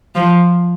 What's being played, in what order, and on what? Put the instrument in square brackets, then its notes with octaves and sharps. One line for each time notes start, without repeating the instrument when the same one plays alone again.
[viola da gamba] F3